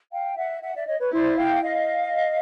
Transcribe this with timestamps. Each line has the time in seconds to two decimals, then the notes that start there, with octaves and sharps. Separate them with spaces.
0.11 F5 G5
0.37 E5 F#5
0.62 E5 F#5
0.75 D5 E5
0.87 C#5 D#5
1.00 B4 C#5
1.13 E4 C5 D5
1.38 F5 G5
1.63 D#5 F5